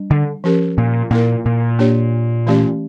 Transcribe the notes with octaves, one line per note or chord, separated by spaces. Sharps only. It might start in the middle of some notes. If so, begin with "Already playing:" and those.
Already playing: G3 D4
D3
F3 C#4 G4 A#4
A#2
A#2 A#3 E4 A#4
A#2
A#3 D4 G4 C#5
E3 A3 C#4 G4 D5